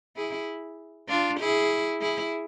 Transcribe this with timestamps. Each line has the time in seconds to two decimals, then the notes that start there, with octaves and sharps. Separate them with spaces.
0.16 E4 G#4
1.09 D4 F4
1.40 E4 G#4
2.01 E4 G#4